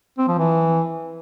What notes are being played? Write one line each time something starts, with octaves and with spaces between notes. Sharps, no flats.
C4
F3
E3